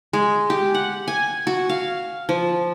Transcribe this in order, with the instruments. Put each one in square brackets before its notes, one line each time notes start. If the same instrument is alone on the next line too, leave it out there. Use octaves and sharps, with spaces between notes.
[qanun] G#3
G4
F#5
G#5
F#4
F5
F3